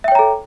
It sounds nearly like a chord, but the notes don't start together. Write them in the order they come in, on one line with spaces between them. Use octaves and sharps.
E5 G5 C#5 A#5 A4